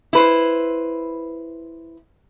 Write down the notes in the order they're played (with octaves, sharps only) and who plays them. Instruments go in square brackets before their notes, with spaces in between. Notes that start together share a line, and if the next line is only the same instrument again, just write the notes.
[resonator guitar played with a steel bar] E4 B4 C5